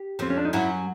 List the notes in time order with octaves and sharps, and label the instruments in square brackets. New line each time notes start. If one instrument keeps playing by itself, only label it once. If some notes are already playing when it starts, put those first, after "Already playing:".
Already playing: [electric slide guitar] G4
[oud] F2 F3 [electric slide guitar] C4
[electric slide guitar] C#4
D4
D#4
[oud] F#2 F#3 [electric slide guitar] E4